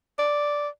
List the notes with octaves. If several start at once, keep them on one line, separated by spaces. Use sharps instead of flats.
D5